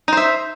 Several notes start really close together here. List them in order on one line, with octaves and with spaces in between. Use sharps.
D#4 C5 E5